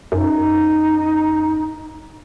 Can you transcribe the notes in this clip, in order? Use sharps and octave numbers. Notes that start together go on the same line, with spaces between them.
F#2 D#4